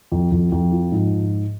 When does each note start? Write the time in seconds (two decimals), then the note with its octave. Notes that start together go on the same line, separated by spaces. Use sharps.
0.12 F2
0.32 F2
0.52 F2
0.72 F3
0.92 G#2